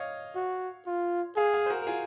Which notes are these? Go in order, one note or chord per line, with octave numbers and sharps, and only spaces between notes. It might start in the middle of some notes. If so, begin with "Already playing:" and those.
Already playing: C#5 D#5 F5
F#4
F4
G#4 F5 G#5
F5 G#5
C5
F#4 A#4
A#4
F4 G#4